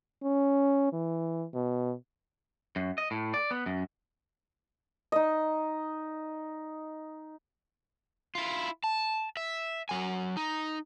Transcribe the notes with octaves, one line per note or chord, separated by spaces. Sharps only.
C#4
E3
B2
F#2
D#5
A2
D5
B3
F#2
D#4 D#5
E4 F4
A5
E5
F#3 G#5
D#4